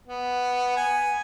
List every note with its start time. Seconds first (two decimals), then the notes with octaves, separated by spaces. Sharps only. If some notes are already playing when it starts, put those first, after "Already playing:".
0.08 B3
0.76 G#5